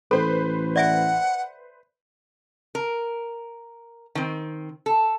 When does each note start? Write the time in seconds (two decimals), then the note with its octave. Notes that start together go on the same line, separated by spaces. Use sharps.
0.11 A1 A4 B4 C5
0.76 D5 E5 F#5 G#5
2.75 A#4
4.15 D#3 C4
4.86 A4